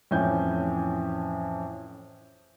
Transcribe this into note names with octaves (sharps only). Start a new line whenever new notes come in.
F2 A2 E3 C#4 G#5 G6